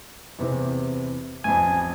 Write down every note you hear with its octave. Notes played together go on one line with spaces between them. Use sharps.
E2 C3 E3
A1 F2 G#5